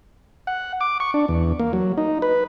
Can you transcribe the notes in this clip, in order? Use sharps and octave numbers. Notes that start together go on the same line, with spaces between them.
F#5
D6
C#6
D4
E2
A#3
F#3
D#4
B4